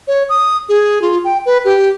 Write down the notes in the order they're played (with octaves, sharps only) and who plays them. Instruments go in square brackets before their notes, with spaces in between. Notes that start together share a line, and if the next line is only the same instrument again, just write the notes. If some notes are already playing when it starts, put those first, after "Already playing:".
[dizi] C#5
D#6
G#4
F4
G5
B4
G4